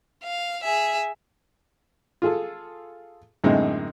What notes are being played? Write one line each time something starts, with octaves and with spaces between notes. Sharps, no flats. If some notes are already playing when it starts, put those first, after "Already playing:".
F5
G#4 E5
F4 G#4 A4
F#2 A2 D3 G#3 C4 D#4